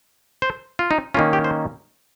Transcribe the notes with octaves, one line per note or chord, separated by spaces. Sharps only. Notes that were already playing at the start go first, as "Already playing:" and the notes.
C5
F4
D#4
D#3 A#3 C#4 F4
G4
C5